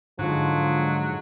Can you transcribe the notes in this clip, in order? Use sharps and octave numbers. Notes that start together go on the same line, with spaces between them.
G#2 D3 F3 F#3